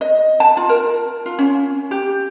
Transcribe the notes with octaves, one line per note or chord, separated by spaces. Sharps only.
D#5
A5
F4
A#4
F4
C#4
G4